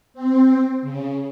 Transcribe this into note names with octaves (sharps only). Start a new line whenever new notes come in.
C4
C#3